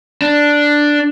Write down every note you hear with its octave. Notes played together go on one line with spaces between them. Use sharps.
D4